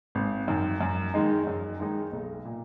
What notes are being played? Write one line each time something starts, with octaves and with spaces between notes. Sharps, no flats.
G#1
F#2 D#3
F#2
D#3 G#3 D#4
F#2
D#3 G#3 D#4
B1
A#2